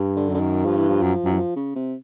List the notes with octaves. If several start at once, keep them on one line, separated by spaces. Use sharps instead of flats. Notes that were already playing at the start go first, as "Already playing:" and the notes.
Already playing: G2
D3
F#2
D3
D#3
G2 F3
E3
F3
F#2
F#2
E3
F3
C#3
C3